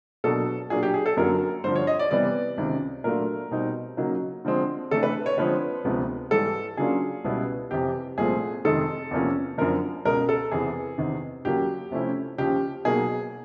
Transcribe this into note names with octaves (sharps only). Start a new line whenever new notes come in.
B2 F#3 A#3 D4 A4
A#2 F#3 A#3 D4 G#4
G4
G#4
A4
F#2 D3 F#3 A#3 A#4
G2 D3 F3 C5
C#5
D#5
D5
C3 E3 G3 B3 D5
C#2 C3 D#3
A#2 F#3 A3 D4 F4 A#4
B2 G3 C4 D#4
C#3 F#3 A#3 D#4
D3 F3 G#3 C4
C3 E3 A3 D4 A4
B4
C#5
D3 F3 G#3 C4 B4
D2 C3 F3 G#3 B3
G#2 E3 G3 A4
C#3 F#3 A#3 D4 F4 G#4
C#2 B2 G3 B3 E4
F2 C3 E3 G4
C2 A#2 F3 A3 C4 G#4
F2 C3 D#3 G#3 C4 A4
E2 C3 F3 A#3 C#4
F#2 D3 F3 A#4
C#2 B2 G#3 A#4
A4
E2 C3 E3 G#4
E2 C3 D#3
D#2 C#3 F#3 A#3 G4
C3 F3 A3 C#4 E4
D#2 C#3 F3 G4
B2 F#3 A#3 D#4 G#4